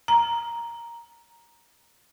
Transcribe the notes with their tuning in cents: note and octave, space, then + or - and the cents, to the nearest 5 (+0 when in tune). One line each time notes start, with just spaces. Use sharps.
A#5 +5